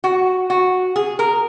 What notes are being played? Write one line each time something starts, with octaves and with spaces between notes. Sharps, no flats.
F#4
F#4
G#4
A#4